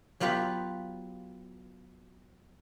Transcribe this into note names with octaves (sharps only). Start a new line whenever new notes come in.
F#3 B3 F4 G4 B4